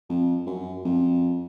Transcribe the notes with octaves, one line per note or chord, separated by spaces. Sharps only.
F2
F#2
F2